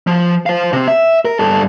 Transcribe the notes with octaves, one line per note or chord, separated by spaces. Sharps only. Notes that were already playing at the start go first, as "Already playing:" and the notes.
F3
C5 F5
C3 C4
E5
A#4
G2 A4